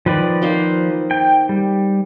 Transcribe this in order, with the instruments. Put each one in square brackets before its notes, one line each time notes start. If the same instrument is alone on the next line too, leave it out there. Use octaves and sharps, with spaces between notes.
[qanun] D#3 [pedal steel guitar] F3 B4 D5
[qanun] A#3 D#4 C5
[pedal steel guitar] G5
G3